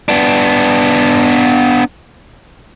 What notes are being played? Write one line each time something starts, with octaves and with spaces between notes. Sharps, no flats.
B3 D4